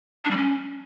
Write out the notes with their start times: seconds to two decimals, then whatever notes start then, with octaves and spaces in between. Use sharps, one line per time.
0.25 D4
0.31 G3
0.37 C#4